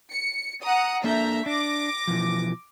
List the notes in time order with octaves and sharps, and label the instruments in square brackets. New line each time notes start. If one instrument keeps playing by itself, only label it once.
[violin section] C#7
F#5 A#5 D#6
[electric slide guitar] A#3 D4 A4 [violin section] E5 A#5 G6
[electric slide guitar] D4 [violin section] D6 A#6
[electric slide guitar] B2 E3 F3